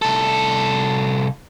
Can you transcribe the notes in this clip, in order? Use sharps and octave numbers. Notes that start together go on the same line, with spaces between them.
C2 A4